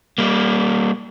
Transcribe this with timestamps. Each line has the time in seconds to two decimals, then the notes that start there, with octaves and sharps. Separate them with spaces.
0.18 G3 A#3